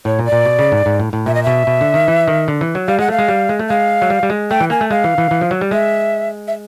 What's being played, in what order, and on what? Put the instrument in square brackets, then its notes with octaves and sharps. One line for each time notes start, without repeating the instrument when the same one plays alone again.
[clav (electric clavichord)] A2 [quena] C#5
[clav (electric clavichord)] A#2
[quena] D5
[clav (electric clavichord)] A#2
B2
C#3
G#2
G#2
A2
A2
[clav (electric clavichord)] A#2 [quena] E5
[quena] D#5
[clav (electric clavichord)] B2 [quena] E5
[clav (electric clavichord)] B2
D3
D#3
E3
D#3
D3
E3
F#3
[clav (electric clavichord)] G3 [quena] F5
[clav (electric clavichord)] G#3 [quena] F#5
[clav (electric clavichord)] A3 [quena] F5
[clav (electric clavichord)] G#3
G3
G#3
A3
[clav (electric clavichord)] G#3 [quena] F5
[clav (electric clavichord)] F#3
G3
G3
G#3
[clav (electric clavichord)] A3 [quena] G5
[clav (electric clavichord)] E3
[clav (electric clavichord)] A#3 [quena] G#5
[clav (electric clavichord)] A3
[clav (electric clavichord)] G#3 [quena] F5
[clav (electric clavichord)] E3
E3
E3
F3
F#3
G3
[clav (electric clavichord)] G#3 [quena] E5
[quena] E5